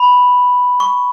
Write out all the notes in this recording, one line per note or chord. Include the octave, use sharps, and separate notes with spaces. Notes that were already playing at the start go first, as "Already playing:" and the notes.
Already playing: B5
C#6